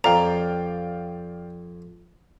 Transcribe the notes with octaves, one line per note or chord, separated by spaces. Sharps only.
F2 D5 F5 G5 A#5